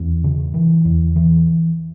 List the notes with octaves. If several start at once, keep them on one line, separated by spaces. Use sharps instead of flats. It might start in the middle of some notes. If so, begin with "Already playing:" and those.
Already playing: E2 C4
C#3
E3
E2
E3